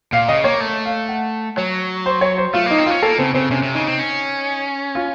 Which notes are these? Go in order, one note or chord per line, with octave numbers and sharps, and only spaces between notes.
A#2 F5
C#3 D#5
A#3 C#5
A3
F5
F#5
F#3 C#5
C5
C#5
C5
A3 F4
A#3 D#4
C4
C#4 F4
A#3 A4
C#3 C4
C#3 C4
C3 C#4
C3
C#3 D#4
C4
C#4
F4